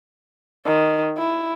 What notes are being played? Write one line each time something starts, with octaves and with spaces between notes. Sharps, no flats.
D#3
E4